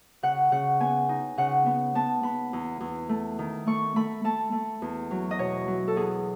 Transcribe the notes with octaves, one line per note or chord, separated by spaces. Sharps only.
C#3 F#5
C#3 F#5
B3 G#5
D#4
C#3 F#5
B3
B3 A5
B3 B5
E2
E2
A3
D#3
A3 C#6
A3 B5
A3 A5
A3
E2
F#3
D#5
B2 C#5
F#3
A4
E2 G#4